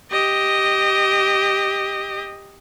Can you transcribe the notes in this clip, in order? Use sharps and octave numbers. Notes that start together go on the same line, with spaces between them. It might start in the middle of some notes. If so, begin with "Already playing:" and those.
G4 D#5